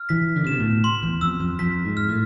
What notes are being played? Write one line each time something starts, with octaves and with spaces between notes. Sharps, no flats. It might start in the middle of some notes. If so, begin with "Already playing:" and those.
Already playing: F6
E3 B6
D3
C3
B2 E7
A2
C6
E2
F2 E6
F2
F2 B6
G#2
F6
A2